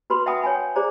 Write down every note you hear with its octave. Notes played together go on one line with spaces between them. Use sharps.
F#4 B4 B5 C6
E5 F#5 G5 A5 B5 D#6
C#5 G5 G#5 B5
G5
G#4 C5 D5 A#5